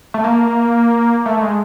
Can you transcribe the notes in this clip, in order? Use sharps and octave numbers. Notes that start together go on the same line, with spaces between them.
A3
A#3
A3
G#3